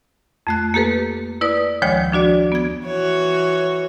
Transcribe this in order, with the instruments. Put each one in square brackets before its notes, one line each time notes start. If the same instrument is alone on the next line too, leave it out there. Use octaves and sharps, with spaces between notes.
[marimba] F2 A3 F#6
A#3 G4 A4 B4
E4 B4 D5 D#6
D2 D#3 F3 G#3 C#5 G5
F3 D4 F#4 D5
B3 G#6
[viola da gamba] E3 F#4 C#5